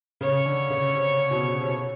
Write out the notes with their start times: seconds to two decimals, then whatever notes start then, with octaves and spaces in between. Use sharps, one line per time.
0.21 C#3 C#5
0.46 D3
0.70 C#3
0.95 C3
1.31 B2
1.61 C3
1.68 B2